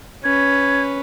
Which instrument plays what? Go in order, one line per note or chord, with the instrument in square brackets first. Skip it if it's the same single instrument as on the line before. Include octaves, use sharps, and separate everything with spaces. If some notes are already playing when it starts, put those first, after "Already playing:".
[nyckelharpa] C#4 B4 [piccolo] G#6